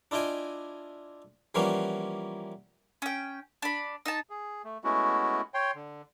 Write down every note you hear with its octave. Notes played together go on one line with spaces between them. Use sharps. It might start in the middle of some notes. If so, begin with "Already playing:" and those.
D4 E4 F4 D#5 G5 G#5
E3 F3 G3 A#3 B3 C#4
C#4 G5
D4 B5
D#4 A5
G#4
A3
G#3 A3 B3 C#4 E4 F#4
C#5 G5 C6
D3